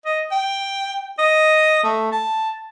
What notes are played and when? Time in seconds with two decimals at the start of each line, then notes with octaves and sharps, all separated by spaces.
0.06 D#5
0.32 G5
1.19 D#5
1.83 A3
2.12 A5